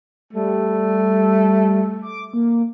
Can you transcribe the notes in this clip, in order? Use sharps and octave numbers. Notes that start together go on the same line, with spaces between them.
G3 A3
D6
A#3